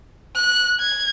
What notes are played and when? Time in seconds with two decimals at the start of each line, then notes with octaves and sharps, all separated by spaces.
0.36 F#6
0.80 G#6